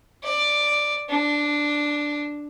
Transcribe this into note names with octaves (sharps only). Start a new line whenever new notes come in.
D5
D4